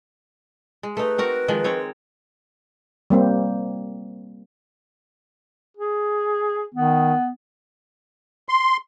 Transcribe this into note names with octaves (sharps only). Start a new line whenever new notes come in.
G#3
A3 D#4 B4
C4 F#4 A#4
D#3 F3 G#3
D#3 C4 C#5
G3 A#3 C4
G#4
D#3 B3
C6